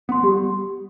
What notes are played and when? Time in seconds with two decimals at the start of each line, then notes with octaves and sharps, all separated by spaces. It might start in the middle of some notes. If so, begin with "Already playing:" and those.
0.09 B3 F#5 C6
0.23 G3 G4